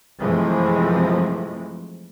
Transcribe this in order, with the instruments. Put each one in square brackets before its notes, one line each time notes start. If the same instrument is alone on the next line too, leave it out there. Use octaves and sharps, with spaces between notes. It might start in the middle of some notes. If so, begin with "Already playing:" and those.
[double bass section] F#2 C3 E3 F3 G#3 A3